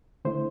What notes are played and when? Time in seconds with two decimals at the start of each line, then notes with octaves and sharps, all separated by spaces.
0.25 D3 A3 E4 C5